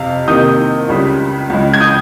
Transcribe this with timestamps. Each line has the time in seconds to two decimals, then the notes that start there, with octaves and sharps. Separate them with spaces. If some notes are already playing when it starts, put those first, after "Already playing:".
Already playing: F2 C3 F3 F5
0.28 C3 D#3 A#3 D#4 D#6 G6
0.89 C#2 C#3 G3
1.50 C#2 C#3 G#3
1.74 G#6
1.81 D#6 G6